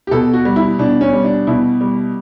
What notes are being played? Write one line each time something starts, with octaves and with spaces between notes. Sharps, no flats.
G4
B2 A4
F#4
G3
E4
B2 D4
C#4
G3
D4
B2 E4
G3